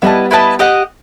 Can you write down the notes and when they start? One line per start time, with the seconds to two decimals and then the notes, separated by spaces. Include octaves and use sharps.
0.02 G3 B3 E4 B4 D#5 A5
0.31 E4 B4 D#5 A5
0.59 G4 D#5 F#5